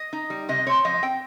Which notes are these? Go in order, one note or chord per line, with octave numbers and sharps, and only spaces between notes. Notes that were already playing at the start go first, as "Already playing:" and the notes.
Already playing: D#5
D#4
G3
C3 D#5
C4 C#5
F3 D#5
C4 G5